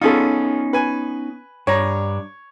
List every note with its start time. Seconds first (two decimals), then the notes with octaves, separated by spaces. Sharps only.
0.01 B3 C#4 D#4 F4 G#4 A4
0.73 B4 G#5
1.67 G2 D4 C#5 A#5